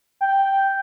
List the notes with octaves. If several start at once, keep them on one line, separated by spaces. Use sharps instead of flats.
G5